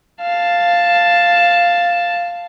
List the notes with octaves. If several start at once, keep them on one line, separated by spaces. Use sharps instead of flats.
F5 A5